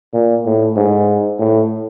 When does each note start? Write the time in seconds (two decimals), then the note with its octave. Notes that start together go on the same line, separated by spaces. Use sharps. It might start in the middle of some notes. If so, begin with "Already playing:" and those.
0.14 A#2
0.46 A2
0.77 G#2
1.39 A2